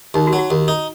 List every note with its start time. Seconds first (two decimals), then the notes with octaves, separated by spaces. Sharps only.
0.14 D#2 D#4
0.27 F#4
0.33 F#3
0.38 F#4
0.50 D#2
0.68 D#4